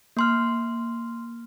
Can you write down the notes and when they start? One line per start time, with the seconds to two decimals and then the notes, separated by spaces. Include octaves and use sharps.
0.17 A#3 C6 F6